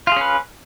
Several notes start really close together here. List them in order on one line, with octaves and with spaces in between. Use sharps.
F4 G#4 C#4 B4